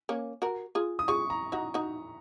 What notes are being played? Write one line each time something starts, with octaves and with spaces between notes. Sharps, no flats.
A#3 C#4
F#4 A#4
F4 G#4
D#6
F4 G#4 C#6
A#5
D#4 F#4 A#5
D#4 F#4